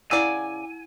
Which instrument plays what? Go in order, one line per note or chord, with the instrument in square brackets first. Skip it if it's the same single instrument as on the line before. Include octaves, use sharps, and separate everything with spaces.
[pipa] C#3 D5 [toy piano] E4 F#5 E6 [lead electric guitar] G#5